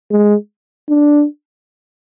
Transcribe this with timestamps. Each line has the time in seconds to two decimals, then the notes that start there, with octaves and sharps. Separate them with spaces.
0.11 G#3
0.89 D4